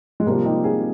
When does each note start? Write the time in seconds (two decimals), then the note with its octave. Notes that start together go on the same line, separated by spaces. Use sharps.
0.20 G#3
0.27 C3 F3 G3 A#3
0.46 D#4 G4
0.64 F4 G#4